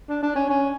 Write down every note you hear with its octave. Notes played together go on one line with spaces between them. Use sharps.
D4
D4
C#4
C#4